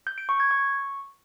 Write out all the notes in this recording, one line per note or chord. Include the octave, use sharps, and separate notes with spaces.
G6
D7
C#6
G#6
C#6